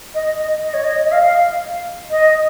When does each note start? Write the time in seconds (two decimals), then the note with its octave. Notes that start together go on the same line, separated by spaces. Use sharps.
0.15 D#5
0.38 D#5
0.64 D#5
0.74 C#5
0.84 D#5
1.04 D#5
1.12 F5
2.11 D#5